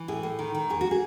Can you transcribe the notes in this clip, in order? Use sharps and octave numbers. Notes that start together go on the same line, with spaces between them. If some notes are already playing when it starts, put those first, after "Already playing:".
Already playing: E3
A2 G#4
A2
D#3
D#3
E2 G#4
F#4
G#4